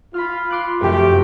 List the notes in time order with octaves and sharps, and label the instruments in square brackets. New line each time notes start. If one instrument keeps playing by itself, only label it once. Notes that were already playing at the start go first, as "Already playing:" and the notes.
[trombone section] F4 [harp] B5 F6
[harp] C6 D6 F#6
[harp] F1 F#2 [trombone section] A3 G4